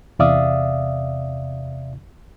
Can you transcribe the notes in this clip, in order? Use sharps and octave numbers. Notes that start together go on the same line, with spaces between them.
E2 C3 D5 E5 F5 D#6